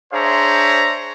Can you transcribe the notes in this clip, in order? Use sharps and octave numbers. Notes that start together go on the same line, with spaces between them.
D4 G#4 C5 C#5 E5 A#5